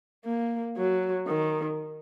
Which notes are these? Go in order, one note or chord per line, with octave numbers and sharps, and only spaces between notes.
A#3
F#3
D#3